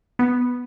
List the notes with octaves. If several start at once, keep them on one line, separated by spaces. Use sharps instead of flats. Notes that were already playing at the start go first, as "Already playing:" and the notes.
B3